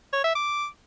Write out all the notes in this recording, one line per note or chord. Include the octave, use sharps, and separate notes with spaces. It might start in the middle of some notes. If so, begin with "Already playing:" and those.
C#5
E5
D6